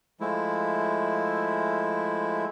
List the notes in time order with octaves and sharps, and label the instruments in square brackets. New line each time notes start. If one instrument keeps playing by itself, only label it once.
[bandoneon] F3 G#3 A3 E4